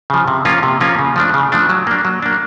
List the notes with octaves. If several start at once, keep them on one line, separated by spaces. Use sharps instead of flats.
C#3 F3
C3
F3 A#3 C#4 F4
C3
F3 A#3 C#4 F4
C#3
F3 A3 D4
C#3
F3 A3 D4
F#3
A#3 D4
F#3
A#3 D4